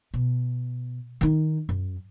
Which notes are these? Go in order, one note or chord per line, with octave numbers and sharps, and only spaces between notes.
B2
D#3 D#4
F#2